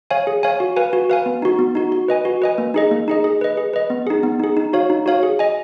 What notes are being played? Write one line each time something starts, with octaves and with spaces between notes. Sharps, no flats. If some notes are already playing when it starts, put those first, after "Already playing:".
C#5 F5 G#5
G#4
C#5 F5 G#5
F#4
B4 F5 G#5
F#4
B4 F5 G#5
B3
D#4 F#4
B3
D#4 F#4
F#4
B4 D#5 G#5
F#4
B4 D#5 G#5
A#3
D#4 G#4 D#5
A#3
D#4 G#4 D#5
G#4
B4 D#5
G#4
B4 D#5
B3
D#4 G#4
B3
D#4 G#4
D#4
F#4 C#5 F5
D#4
F#4 C#5 F5
G#4
D#5 G#5